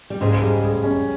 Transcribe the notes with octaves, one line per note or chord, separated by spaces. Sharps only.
G3
G#2 C#3 G#3
G3
G#4
C#4